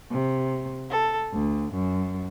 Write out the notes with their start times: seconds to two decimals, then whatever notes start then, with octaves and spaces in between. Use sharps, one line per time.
0.11 C3
0.90 A4
1.33 D2
1.73 F#2